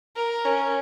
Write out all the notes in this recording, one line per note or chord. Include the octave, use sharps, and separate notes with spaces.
A#4
C#4